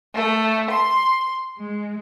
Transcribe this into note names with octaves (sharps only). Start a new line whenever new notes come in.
A3
C6
G#3